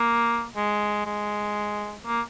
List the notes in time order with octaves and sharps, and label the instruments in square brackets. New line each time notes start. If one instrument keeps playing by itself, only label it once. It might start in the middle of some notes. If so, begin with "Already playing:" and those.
Already playing: [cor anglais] A#3
G#3
G#3
A#3